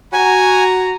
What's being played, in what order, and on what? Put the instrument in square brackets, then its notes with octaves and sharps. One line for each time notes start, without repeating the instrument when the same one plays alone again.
[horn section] F#4 A#5 [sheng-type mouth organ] G#5